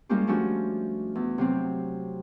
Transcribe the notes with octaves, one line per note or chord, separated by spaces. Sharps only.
G3 G#3 A#3 C#4 F4 G4
F3 A3 C#4 D4 F#4
E2
C3 F#3 C4